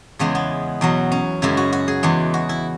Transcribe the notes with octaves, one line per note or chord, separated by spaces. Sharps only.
E2 C#3 E3 G#3 B3
B3
E2 B2 F#3
C#4
F#2 C#3 G#3 E4
F#4
F#4
G#4
E2 E3 G#3
F#4
E4